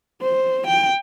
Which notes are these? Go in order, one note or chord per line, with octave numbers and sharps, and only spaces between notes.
C5
G5